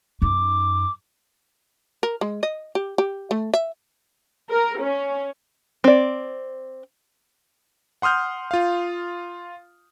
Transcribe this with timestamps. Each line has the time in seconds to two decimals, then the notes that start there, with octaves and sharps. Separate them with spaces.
0.22 F#2 D#4 D6
2.03 A#4
2.21 G#3
2.43 D#5
2.75 G4
2.98 G4
3.31 A3
3.54 E5
4.50 A#4
4.80 C#4
5.84 C4 D5
8.02 F#5 C6 D#6 F6 G6
8.51 F4 F5